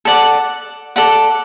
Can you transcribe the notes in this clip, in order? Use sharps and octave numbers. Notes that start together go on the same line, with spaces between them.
A4 D5 F#5
A4 D5 F#5